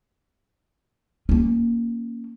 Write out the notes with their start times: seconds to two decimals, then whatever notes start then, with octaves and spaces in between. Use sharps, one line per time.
1.29 A#3 C#4